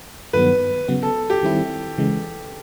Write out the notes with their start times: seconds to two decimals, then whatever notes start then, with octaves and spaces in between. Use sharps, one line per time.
0.33 G2 D#3 F#3 B3 B4
0.88 C#3 F#3 B3
1.03 A4
1.30 G4
1.43 D#3 G3 C4 E4
1.98 C#3 E3 G#3